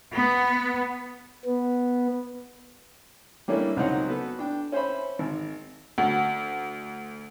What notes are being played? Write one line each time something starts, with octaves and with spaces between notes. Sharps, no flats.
B3
B3
G3 A3 A#3 C#4 D4 E4
C#2 F#3 C4 C#4 D#4 F#5
B3 F#4 A4 B4
D4 G5
C#4 C5 E5 B5
G#1
D2